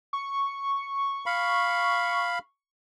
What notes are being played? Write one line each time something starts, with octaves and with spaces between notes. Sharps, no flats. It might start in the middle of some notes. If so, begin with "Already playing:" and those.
C#6
F5 B5